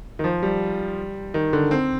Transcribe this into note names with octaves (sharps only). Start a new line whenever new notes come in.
D#3
F3
G3
D#3
D3
C4